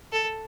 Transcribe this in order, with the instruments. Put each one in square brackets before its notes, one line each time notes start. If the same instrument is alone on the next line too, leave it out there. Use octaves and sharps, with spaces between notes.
[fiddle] A4